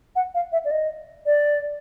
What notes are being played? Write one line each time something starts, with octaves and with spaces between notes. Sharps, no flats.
F#5
F5
E5
D5
D#5
D5